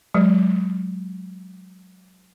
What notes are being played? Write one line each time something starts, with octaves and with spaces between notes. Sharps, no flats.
F#3 G#3